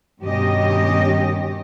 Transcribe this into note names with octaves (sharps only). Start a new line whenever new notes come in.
G2 B2 D#3 C#4 G4 D#5